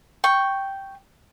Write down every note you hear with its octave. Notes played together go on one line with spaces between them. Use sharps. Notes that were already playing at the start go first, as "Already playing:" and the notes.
G5 C#6